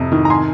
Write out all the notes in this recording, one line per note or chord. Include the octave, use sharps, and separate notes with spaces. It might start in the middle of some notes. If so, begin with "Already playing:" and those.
Already playing: F2 C3
D#3
A#5
G#5 C6